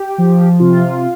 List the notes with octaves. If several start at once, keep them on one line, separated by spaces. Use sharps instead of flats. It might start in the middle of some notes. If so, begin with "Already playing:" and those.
Already playing: G4
F3
C3 F4